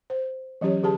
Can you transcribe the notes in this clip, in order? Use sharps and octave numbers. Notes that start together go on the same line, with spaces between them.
C5
E3 F#3 C#4 G4 C#5
D3 G4 G#4 A5